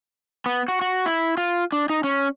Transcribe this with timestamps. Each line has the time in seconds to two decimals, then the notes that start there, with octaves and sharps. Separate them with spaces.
0.46 B3
0.68 F#4
0.81 F#4
1.06 E4
1.37 F4
1.72 D4
1.90 D#4
2.04 C#4